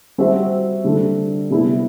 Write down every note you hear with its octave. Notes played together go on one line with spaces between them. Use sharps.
G3 C4 F#4 C5 E5
D3 G3 D4 A4
C3 G3 B3 E4